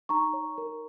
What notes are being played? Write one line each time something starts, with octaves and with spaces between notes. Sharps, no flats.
D#4 A#5 C#6
C#5
A#4